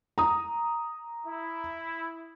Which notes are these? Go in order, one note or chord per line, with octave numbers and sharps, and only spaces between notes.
A#5 D#6
E4